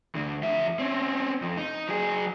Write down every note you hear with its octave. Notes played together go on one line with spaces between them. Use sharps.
D2 D3
F2 E5
C4 C#4
F2
D#4
F#3 G#4